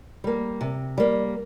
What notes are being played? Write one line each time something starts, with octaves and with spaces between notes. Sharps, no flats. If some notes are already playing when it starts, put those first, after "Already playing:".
G3 A#3
C3
G3 A#3